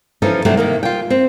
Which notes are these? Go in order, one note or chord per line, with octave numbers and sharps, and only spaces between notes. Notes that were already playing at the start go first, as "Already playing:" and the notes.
E3 F3 C#4 D#4 A4
C3 F#3 G3 A3 D4
C3 D#3 A#3
F4 G5
C4